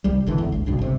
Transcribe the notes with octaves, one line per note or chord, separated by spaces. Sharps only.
C2 G3
G1 D3 E3
E2
G#1 D2
C2 G2 B2 D3
G1 C3